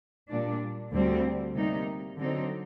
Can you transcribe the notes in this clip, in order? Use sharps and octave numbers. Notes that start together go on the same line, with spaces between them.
A#2 G3 D4
D2 D3 G3 C4
C3 G3 A#3 D#4
D3 F#3 C4 D#4